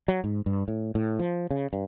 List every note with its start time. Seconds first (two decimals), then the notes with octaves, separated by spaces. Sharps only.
0.08 F#3
0.24 G#2
0.46 G2
0.68 A2
0.95 A2
1.19 F3
1.51 C#3
1.73 G2